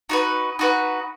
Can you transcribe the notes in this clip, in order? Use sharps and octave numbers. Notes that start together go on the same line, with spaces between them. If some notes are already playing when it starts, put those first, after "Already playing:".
D#4 F#4 B4
D#4 F#4 B4